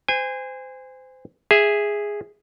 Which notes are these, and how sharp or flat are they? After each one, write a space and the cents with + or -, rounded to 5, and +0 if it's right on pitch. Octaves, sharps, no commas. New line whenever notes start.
C5 -25 G#5 -30
G#4 -5 E5 +0